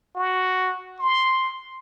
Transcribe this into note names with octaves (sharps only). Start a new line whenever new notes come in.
F#4
C6